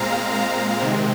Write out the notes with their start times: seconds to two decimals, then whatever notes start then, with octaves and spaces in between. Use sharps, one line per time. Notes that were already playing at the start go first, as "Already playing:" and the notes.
Already playing: A#2 G#3 C4 F5 A#5
0.34 F5 A#5
0.81 C3 D#3 G#3 C4